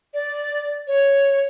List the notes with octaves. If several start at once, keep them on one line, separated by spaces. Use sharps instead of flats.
D5
C#5